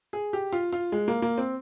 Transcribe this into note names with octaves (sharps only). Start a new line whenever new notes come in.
G#4
G4
F4
F4
G#3
A#3
A#3
C4